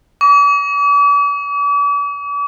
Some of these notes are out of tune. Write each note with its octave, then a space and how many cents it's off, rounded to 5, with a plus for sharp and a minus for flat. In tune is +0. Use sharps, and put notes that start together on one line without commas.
D6 -45